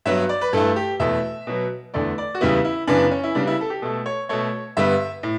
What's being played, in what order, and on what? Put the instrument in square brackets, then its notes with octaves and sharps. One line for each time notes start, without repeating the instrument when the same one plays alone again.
[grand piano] G2 F#3 B3 E5
D5
B4
G2 E3 A3 A4
G4
E2 B2 A3 E5
B2 F#3 B3
E2 D3 A3 D5
D5
F#4
E2 C#3 G3 B3 E4
E4
F#2 C#3 E3 B3 D4
C#4
E4
C#3 G3 B3 D4
E4
A4
G4
B2 A3 A4
C#5
B2 A3 C#5
G2 D3 G3 B3 E5
A2